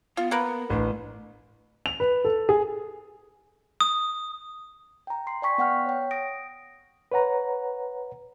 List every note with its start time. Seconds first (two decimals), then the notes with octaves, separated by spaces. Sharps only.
0.17 B3 F4
0.31 A#3 A#4 B4
0.70 A1 D4
1.86 F7
2.00 B4
2.25 A4
2.49 G#4
3.81 D#6
5.07 G5 A#5
5.27 C6 C7
5.42 D5 G5 G#5 C#6 B6
5.58 B3 F#5 G5 F6
5.86 C#5 G5
6.11 D#6 A#6 D7
7.12 B4 C#5 F#5 A#5